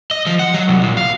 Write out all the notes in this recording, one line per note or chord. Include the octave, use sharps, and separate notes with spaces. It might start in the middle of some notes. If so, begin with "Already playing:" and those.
D#5
F3
F#5
F#3
C2
A#2
F5